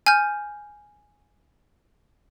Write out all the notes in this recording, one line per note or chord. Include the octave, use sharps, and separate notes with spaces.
G#5 F6 G6